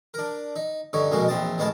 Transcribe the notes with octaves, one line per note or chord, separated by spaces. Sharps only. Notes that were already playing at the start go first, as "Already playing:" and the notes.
D4 A#4
D#4
G2 D3 D#4 C#5
A#1 F2 B2 G#3 A#3 F#4
A#1 E2 C4 D#5 A5
A1 G#3 B3 A#4 C#5 A5